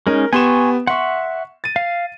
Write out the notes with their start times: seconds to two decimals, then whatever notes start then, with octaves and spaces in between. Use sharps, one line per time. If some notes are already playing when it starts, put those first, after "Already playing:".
0.07 G#3 C#4 D#4 A#4
0.33 B3 G4 G#5 C6 C#6 E7
0.87 E5 F#5 C6 C#6
1.64 A6 D#7
1.76 F5